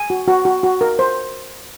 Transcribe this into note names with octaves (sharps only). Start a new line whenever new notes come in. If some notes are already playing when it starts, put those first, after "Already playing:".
Already playing: G#5
F#4
F#4
F#4
F#4
A#4
C5